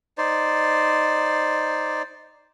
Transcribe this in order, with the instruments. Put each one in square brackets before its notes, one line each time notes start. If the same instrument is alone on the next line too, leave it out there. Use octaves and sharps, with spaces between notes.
[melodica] D#4 C5 D5